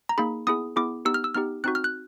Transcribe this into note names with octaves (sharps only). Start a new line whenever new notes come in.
A#5
A#3 D#4 G#4 B5
B3 E4 G#4 D#6
B3 E4 G#4 D6
B3 D#4 G4 E6
F6
E6
B3 D#4 G4 F6
C4 D#4 F#4 F#6
F6
F#6